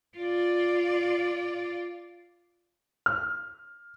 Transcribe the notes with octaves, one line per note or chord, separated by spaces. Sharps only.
F4 D5
F6